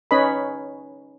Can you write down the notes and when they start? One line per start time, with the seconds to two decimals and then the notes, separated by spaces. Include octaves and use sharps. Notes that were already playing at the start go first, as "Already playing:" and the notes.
0.11 C#4 D#4 B4 C#5 D#5 B5